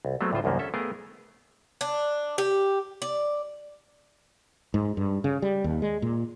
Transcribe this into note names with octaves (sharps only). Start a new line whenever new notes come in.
C2
F#3 G#3 A3 B3 C4
D2 A2 D3 F4 C5
C2 F#2 D#3 A#3 B3
C#4 A4 E5
A3 B3 G#4 A#4 F5 G5
D4
G4
D5
G#2
G2
C#3
G3
D#2
G#3
A#2